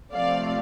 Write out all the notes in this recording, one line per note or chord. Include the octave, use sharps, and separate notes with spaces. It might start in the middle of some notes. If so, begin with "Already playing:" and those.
C3 F3 A3 C4 D5 F5